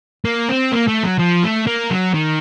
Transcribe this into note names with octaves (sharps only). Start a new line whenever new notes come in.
A#3
C4
A#3
A3
F#3
F3
A3
A#3
F#3
D#3